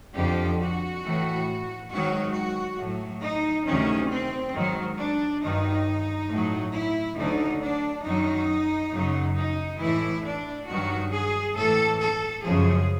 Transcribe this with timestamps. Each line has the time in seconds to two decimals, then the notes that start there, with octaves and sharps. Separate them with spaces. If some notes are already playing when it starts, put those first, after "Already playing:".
0.15 F2 D3 F3 G4
0.59 F#4
1.02 A2 E3
1.90 G#2 D#3 F#3 F#4
2.34 F#4
2.78 A2
2.83 F#3
3.22 D#4
3.66 D2 C3 D#3 F#3 C#4
4.10 C4
4.53 G#2 D#3 F#3
4.97 D4
5.42 G2 D#3 F#3 D#4
6.29 A2 F#3
6.73 E4
7.17 D2 D3 F#3 D#4
7.61 D4
8.04 F#2 D#3 F#3 D#4
8.93 F#2 C#3 F#3
9.37 D#4
9.80 A2 E3 E4
10.25 D4
10.68 G2 D#3 F#3 F#4
11.12 G#4
11.55 A2 E3 A4
12.00 A4
12.44 F#2 C#3 F3 G#4